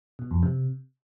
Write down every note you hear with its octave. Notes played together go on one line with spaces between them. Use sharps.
B2
F2
C3